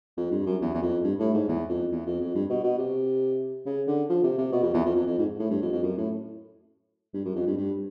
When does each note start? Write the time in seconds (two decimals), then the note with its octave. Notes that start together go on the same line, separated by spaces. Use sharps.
0.17 F2
0.31 G2
0.46 F#2
0.61 E2
0.74 E2
0.82 F2
1.04 G2
1.19 A2
1.34 G#2
1.48 E2
1.69 F2
1.92 E2
2.06 F2
2.21 F2
2.35 G2
2.50 B2
2.64 B2
2.78 C3
3.66 C#3
3.87 D3
4.09 F3
4.23 C3
4.38 C3
4.52 B2
4.63 F2
4.74 E2
4.85 F2
4.95 F2
5.07 F2
5.18 G#2
5.39 A2
5.50 G2
5.62 F2
5.72 F2
5.83 F#2
5.98 A2
7.14 G2
7.25 F#2
7.35 F2
7.47 G2
7.57 G2